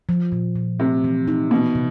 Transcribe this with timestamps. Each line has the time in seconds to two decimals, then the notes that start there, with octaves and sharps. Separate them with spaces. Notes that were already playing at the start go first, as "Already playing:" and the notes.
0.09 F3
0.32 A#2
0.55 A#2
0.79 C3 A3
1.04 E3
1.28 D#4
1.51 B2 E3
1.75 C3